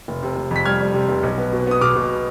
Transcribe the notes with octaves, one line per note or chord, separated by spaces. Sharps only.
F1
C3
F1
F2
B6
G3 F6 G#6
G3
C3
F1
B1
B3
B2
B3 D#6
B2 D6 F6
B2